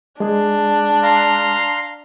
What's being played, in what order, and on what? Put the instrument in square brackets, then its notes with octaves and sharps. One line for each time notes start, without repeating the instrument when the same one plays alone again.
[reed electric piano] G#3 G#4 [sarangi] D4
[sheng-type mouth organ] F5 A#5 C6